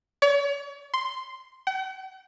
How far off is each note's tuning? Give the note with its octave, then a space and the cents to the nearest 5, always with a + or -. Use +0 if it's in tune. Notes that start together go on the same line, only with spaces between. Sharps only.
C#5 +40
C6 -5
F#5 +45